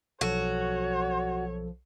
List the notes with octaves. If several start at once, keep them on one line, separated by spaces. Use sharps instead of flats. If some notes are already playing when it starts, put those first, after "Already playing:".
B1 F3 F#4 A4 C#5